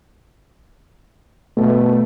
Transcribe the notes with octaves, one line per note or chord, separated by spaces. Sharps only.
B2 A3